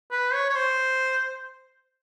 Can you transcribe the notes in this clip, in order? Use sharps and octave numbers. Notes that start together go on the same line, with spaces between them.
B4
C#5
C#5
C5